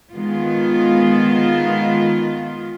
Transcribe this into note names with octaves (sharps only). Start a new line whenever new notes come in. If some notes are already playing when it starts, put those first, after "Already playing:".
D#3 G#3 B3 F4